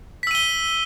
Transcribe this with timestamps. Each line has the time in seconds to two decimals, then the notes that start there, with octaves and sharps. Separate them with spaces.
0.23 B6
0.27 E6
0.31 D#7
0.35 G7